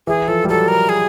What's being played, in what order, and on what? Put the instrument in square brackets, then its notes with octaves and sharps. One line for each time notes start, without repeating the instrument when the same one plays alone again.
[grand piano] E3 [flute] G#4
[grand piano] F3 [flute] A4
[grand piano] G3
[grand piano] F#3 [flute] A4
[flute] A#4
G#4